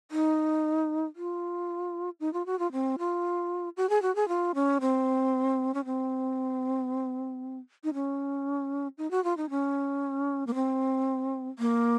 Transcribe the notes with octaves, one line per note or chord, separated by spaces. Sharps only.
D#4
F4
D#4
F4
F#4
F4
C4
F4
F#4
G#4
F#4
G#4
F4
C#4
C4
C#4
C4
D#4
C#4
D#4
F#4
F4
D#4
C#4
A#3
C4
A#3